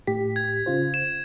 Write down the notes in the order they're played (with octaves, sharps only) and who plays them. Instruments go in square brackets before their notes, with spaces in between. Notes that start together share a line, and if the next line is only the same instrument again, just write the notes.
[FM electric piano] A2 G4 B6
[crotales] G#6
[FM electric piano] C#3 F4 C5
[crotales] E7